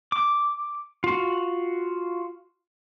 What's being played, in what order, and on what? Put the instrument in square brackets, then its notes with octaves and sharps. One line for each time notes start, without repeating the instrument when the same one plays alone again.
[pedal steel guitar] D6
F4 F#4